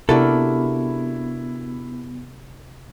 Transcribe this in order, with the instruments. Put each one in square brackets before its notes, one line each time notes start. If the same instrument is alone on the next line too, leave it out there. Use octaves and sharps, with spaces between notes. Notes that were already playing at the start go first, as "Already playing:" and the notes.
[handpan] C3 G4 A#4 [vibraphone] B3 [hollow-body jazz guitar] D4 F#4 A4 [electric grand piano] E4